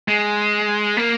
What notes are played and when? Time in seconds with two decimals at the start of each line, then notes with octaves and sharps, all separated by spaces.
0.08 G#3
0.97 A#3